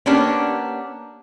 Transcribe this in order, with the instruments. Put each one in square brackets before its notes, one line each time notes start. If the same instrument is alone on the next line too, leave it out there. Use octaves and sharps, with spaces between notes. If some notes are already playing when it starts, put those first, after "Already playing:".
[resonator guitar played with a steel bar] A#3 B3 C#4 D4 G4